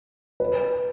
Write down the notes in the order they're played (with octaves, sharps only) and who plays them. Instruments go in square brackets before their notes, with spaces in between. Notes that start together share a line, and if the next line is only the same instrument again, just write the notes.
[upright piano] B4